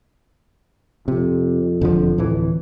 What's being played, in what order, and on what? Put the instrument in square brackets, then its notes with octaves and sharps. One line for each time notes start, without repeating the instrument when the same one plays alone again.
[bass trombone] F2 [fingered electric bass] C3
[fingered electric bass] E1 D3 F3
D1 E3